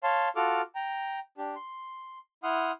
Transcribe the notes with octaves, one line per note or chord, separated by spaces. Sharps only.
C#5 F5 A5 C6
F4 F#4 A4 D6 F6
G5 A#5
D4 G4
C6
E4 F#5 C6 D#6 F6